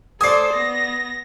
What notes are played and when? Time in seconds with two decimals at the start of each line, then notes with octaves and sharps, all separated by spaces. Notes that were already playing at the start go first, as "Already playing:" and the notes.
0.21 A4 C5 D5 G#5 D#6 C7
0.54 B3 A#6